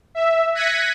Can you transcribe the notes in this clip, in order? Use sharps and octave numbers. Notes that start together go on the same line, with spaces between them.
E5
F#6 G#6 A#6 B6 C#7 D#7